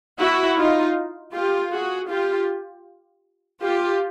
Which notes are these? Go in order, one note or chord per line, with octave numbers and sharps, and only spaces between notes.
E4 F#4
D#4 F4
F4 G4
F#4 G#4
F4 G4
F4 G4